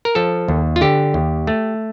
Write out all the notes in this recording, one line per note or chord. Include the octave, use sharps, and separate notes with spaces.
A#4
F3 A4
D#2
F4
D3 G4
D#2
A3